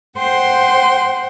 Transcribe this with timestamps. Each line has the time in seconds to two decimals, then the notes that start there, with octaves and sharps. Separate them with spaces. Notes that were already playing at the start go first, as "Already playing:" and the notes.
0.18 C5 F#5 G5 C6